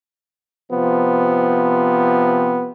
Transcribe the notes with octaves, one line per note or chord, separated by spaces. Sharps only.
C3 F3 B3